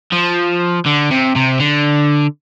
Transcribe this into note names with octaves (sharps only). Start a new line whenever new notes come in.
F3
D3
C3
C3
D3